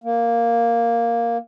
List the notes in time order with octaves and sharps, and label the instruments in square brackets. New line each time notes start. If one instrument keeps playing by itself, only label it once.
[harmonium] A#3